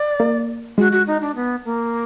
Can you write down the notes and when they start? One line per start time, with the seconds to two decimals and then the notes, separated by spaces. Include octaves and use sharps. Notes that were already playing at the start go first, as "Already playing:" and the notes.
Already playing: D5
0.20 A#3
0.78 G#3 F#4
0.92 F#4
1.07 D#4
1.21 D4
1.35 B3
1.65 A#3